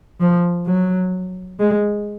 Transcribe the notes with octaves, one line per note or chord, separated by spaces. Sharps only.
F3
F#3
G#3